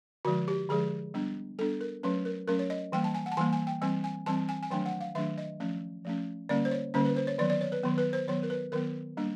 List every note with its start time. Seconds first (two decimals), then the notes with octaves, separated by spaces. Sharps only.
0.25 D3 F3 G#3 F#4
0.48 G4
0.69 D3 F3 G#3 G#4
1.14 G3 B3 D4
1.58 G3 B3 D4 A4
1.81 A#4
2.03 F#3 A3 C#4 B4
2.25 A#4
2.48 F#3 A3 C#4 A#4
2.59 C#5
2.70 D#5
2.92 E3 G3 A#3 G5
3.04 A5
3.15 G#5
3.26 F#5
3.32 A5
3.37 E3 G3 A#3 G#5
3.53 G#5
3.67 G5
3.82 E3 G3 C4 G#5
4.04 G#5
4.26 E3 G3 C4 A5
4.49 G#5
4.63 G#5
4.70 D#3 F#3 A3 D4 G5
4.86 F#5
5.00 F5
5.15 D#3 F#3 A3 D4 E5
5.38 D#5
5.60 F3 A3 C#4
6.05 F3 A3 C#4
6.49 D3 G3 A#3 C#4 D5
6.65 C5
6.71 C#5
6.94 D3 G3 A#3 C#4 C5
7.05 B4
7.16 C5
7.27 C#5
7.38 D#3 F#3 B3 D5
7.50 D5
7.61 C#5
7.72 B4
7.83 D#3 F#3 B3
7.98 B4
8.13 C5
8.28 D#3 F#3 B3 C#5
8.43 A#4
8.50 B4
8.72 D#3 F#3 B3 A#4
9.17 G3 A#3 D4